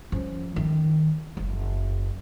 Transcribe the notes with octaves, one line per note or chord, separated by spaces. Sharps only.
F3 C#4
D#3
F#1